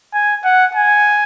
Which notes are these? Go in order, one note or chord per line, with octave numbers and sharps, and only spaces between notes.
G#5
F#5
G#5